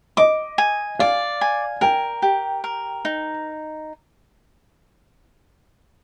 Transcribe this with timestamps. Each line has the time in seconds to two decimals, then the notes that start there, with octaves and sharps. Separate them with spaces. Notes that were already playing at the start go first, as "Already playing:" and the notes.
0.17 D#5 D6
0.58 G#5
0.99 D5 F5
1.41 G#5
1.81 A#4 G5
2.22 G4
2.64 A#4
3.05 D#4